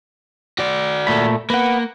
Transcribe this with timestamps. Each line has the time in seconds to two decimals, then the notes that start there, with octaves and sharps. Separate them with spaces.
0.59 F#4 D5
1.07 A#2 A3 B5
1.50 A#3 B4 F#5